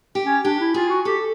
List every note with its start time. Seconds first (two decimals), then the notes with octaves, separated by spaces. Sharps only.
0.15 G4
0.25 C#4
0.45 D4 G4
0.60 E4
0.74 F4 G#4
0.89 F#4
1.05 G4 A4